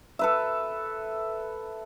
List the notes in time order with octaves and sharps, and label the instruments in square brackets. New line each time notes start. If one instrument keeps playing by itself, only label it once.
[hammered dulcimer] A4 B4 E5